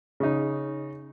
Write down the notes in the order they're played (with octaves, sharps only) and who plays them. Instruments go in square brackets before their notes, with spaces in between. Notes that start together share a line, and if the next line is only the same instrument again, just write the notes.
[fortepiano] C#3 D#4